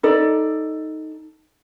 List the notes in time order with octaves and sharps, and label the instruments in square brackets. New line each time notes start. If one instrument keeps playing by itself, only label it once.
[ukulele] D#4 A4 D5